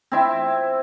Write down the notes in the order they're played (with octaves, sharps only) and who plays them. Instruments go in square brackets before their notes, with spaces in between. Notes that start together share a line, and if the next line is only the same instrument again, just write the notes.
[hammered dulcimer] C4 E4 E5